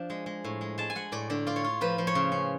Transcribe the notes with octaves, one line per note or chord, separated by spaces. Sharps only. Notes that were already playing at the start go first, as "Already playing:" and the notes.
Already playing: F3 D4
G#3
G#3
A2
G#3
G#3 A5
G#5
G#3 F#5
A2 D5
D3 D5
F4 D5
C#5
F4
F3 B4
F3
C#5
C#3
C#4